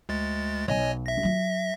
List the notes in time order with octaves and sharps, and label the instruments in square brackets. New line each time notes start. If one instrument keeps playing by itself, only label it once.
[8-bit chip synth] D2 G#3 A6
[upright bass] B1 [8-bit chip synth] C#5 D#5 G#5
[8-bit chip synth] E5 A#6
[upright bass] F#3 F4